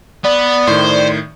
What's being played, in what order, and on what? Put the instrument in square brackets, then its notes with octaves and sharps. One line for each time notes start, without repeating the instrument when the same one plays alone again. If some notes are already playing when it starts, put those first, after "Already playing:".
[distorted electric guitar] B3 [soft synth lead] D5
[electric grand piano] A2 D#3 [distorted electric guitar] C5